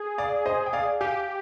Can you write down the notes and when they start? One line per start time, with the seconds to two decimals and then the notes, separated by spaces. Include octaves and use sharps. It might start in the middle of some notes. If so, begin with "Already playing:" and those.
Already playing: G#4
0.18 D5 F5
0.46 C5 D#5
0.66 G5
0.73 D5 F5
1.01 G4 F5 G#5